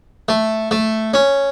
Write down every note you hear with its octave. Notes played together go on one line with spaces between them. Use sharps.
A3
A3
C#4